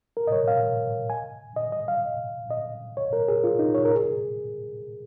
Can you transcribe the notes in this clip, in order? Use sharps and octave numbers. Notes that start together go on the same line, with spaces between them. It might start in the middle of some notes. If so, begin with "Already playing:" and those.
A#4
D#5
C#5
F5
G#5
D#5
D#5
F5
D#5
C#5
A#4
G#4
F4
D#4
C#5
A#4
G#4